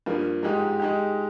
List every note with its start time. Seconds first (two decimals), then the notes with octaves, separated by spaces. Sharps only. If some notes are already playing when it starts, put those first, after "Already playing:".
0.06 G2 F3 A#3
0.42 G#2 F3 G#3 D#4 G4
0.80 G#3 D#4 G4